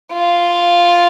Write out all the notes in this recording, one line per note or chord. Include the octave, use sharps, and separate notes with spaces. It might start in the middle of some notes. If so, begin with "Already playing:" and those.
F4